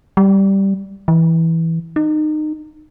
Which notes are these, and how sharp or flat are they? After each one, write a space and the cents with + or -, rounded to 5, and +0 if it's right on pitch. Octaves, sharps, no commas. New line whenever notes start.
G3 -5
E3 -10
D#4 -25